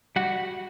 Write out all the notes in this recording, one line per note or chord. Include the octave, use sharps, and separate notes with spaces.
G3 F#4 F#5